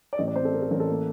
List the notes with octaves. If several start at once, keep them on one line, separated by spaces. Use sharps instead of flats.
D5
A1 D#5
D5
C4 C5
A4
C4 A#4
A4
A1 A#4
A4
A#3